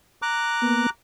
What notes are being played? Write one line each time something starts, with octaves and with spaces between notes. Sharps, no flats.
A#5 D6 F#6
A#3 B3